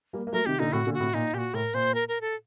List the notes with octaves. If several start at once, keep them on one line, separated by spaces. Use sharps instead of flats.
G3 A#3
A#3
F#3 A3 A#4
C3 D#3 G4
A#2 D3 D#4
A2 C3 F#4
A#2 D3
F#4
A2 C3
A#2 D#4
A#2 G4
F#4
A2 A#4
A#2 C5
A#4
A#4
A4